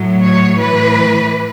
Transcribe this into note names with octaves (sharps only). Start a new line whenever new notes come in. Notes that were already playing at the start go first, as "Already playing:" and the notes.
Already playing: A2 F#3
C#5
A2 E3 B4